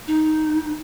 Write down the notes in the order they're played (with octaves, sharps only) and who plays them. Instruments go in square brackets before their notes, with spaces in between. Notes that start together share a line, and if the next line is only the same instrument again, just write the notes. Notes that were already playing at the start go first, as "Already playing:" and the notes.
[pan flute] D#4